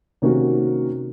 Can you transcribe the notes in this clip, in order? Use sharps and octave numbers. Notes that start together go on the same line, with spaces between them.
C3 D#3 A#3 C#4 F#4